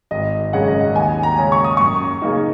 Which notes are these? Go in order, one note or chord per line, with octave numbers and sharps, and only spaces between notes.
G#1 D#5
F#2 C#3 G#3 C#4 F#5
D#5
F#5
D#2 G#5
A#5
C#3 G#3 C#4
C#6
D#6
F#2 C#6
C#3 A#3 D#4